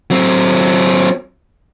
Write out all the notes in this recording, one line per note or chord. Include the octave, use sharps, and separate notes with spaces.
F#3 C4